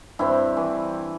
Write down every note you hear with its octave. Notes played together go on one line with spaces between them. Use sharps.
G2 C4 E4
E3